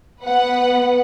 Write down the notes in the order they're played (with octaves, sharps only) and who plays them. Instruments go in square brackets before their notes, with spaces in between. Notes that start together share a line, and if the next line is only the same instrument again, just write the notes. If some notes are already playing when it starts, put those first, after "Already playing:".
[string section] B3 B4 F#5